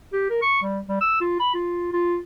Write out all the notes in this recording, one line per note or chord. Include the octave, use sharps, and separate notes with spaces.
G4
A#4
C#6
G3
G3
E6
F4
B5
F4
F4